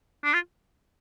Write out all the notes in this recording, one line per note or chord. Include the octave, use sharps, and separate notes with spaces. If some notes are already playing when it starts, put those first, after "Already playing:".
D4
F4